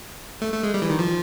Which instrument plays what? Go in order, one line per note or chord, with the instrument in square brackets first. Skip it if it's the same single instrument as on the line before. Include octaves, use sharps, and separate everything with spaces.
[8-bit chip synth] A3
A3
G#3
G3
E3
D#3
F3